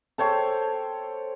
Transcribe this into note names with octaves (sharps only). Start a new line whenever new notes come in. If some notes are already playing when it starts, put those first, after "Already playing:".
A4 C5 C#5 G5